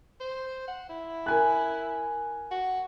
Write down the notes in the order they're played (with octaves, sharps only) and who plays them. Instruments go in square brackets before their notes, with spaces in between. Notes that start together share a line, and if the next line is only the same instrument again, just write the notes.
[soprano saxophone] C5
F#5
E4
[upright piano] A#4 G#5 F#6
[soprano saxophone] F#4